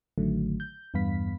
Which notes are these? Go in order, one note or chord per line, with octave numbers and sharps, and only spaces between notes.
A1 D3 D#3 F#3 A3
G6
E2 G2 B3 F5 B5 B6